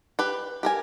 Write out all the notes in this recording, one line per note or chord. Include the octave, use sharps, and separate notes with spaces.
G4 B4
G4 A#4 G#5